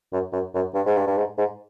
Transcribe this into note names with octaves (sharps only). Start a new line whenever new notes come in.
F#2
F#2
F#2
G2
G#2
G2
G2
G#2
G#2